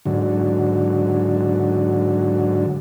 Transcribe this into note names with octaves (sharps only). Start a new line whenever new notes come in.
G#2 D3 F#3